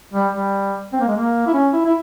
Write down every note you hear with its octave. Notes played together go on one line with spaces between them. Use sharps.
G3
G3
C4
A#3
G#3
A#3
E4
C#4
E4
E4